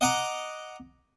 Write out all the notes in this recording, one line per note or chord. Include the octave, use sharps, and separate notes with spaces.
D#5 F#5 A#5 D6